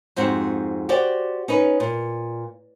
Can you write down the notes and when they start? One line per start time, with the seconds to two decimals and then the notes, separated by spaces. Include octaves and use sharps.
0.16 F2 G#2 C4 F#4
0.89 F#4 G4 C5 D5
1.48 C#4 D#4 B4
1.80 A#2